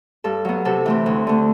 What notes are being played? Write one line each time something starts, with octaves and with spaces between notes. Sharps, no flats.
G2 A4
F#3 B3
C3 A4
E3 A3 C4
D2
D3 A3